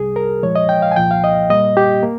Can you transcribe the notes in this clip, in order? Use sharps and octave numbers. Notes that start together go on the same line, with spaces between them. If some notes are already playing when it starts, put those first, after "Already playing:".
Already playing: C2 C3 G3 G#4
A#4
A#2 F3 G#3 C#5
D#5
G5
F5
G#5
C2 A#2 F3 A#3 G5
F5
D#5
A#2 G3 A#3 D#5
G4
A#3